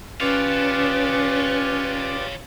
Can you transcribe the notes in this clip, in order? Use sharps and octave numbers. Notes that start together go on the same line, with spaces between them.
C#4 F4 G4 B4 C#5 D5 F5